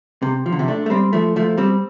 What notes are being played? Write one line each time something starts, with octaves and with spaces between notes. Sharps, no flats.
C3
F3
D3
C3 F3
A3 D4
A3
G3 C4
F3 A3
F3 A3
G3 C4